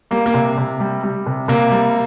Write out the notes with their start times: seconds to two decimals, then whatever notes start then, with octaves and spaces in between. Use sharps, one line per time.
0.11 G3 A#3
0.26 A#3
0.34 C3
0.58 C3
0.80 G3
1.03 G3
1.26 C3
1.48 C3 A#3
1.71 G3